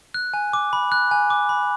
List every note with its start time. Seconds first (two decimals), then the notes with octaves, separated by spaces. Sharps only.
0.14 F#6
0.34 G#5
0.53 D6
0.73 B5
0.92 F#6
1.11 G#5
1.30 D6
1.49 B5